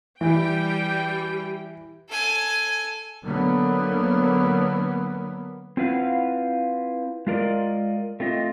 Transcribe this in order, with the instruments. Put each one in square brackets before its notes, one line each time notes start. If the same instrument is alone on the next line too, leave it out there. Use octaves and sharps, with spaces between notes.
[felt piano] E3 [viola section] G3 G5
[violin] A4 G#5
[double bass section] D3 F#3 A#3 B3
[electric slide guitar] C4 E4 F4 B4 F5 F#5
G#3 F4 A#4 D5 D#5
A3 C4 F4 D#5